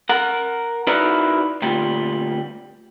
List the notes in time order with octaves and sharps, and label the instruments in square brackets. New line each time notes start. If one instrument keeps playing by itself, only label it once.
[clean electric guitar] A#4 F#5
D#4 E4 F#4 A#4 B4 D5
D2 A#2 G3